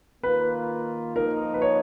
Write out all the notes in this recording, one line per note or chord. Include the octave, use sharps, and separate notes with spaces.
D#3 A#3 F4 B4
F3 A#3 D#4 A#4
B4
C#5